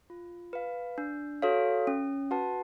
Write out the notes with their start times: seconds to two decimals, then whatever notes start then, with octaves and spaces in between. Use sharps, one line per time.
0.10 F4
0.53 B4 F5
0.98 D4
1.42 F#4 A4 C#5 F5
1.87 C#4
2.31 F#4 B4 F#5 A5